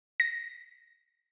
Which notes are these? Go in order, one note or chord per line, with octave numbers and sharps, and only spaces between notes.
A#6